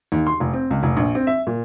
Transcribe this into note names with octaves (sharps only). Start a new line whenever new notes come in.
D#2
C6
F1
C4
C#2
F1
A#1
C4
E5
A#2